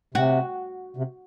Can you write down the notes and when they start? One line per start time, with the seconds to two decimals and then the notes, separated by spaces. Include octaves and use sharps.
0.14 C3 F#4
0.97 C3